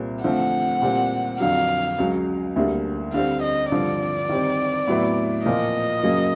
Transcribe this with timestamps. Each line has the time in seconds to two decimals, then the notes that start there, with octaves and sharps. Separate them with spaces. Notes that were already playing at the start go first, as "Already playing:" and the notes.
Already playing: C2 A#2 G3 C4
0.24 D3 F3 A3 C4 F#5
0.82 A#2 G3 C4
1.40 F2 D3 F#3 F5
1.98 C#2 C#3 F#3
2.56 D2 D3 G3 A#3
3.14 D3 G3 C4 F5
3.42 D#5
3.72 G2 D3 F3 D5
4.29 D#3 G3 C4
4.88 A2 F#3 B3 E4
5.45 A#2 F3 A#3 D#5
6.03 F#2 C#3 F#3 A#3